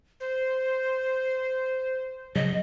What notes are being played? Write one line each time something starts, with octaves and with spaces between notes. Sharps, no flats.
C5
C#3 F#3 D#5